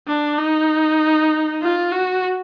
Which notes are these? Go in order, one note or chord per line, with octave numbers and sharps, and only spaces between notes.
D4
D#4
F4
F#4